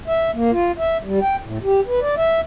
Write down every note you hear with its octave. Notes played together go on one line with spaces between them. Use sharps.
E5
A#3
F4
E5
G3
G5
A2
G4
B4
D5
E5